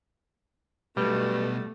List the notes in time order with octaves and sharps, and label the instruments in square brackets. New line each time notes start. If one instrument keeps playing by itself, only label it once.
[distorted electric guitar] B1 B2 [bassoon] G2 [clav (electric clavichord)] G3 [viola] A3